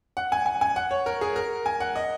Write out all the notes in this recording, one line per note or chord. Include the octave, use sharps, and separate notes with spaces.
F#5
G#5
G#5
G#5
F#5
C#5
A#4
G#4
A#4
G#5
F#5
D#5